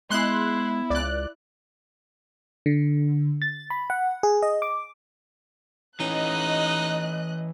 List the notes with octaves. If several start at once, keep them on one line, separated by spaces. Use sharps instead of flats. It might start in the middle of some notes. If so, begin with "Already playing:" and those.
G#3 B3 E4 C6 F#6
C#2 D5 F#6
D3
A6
B5
F#5
G#4
D#5
D6
E3 C#4 D#4 D#5 F#6